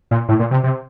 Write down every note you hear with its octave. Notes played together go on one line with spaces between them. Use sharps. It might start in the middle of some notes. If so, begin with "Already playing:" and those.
A#2
A2
A#2
C3
C3